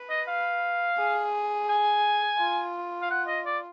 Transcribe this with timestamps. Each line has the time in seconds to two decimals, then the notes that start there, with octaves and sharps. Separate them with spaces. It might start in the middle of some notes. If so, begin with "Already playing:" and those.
Already playing: B4
0.10 D#5
0.28 F5
0.98 G#4
1.69 G#5
2.39 F4
3.02 F5
3.10 F#5
3.28 D#5
3.46 D5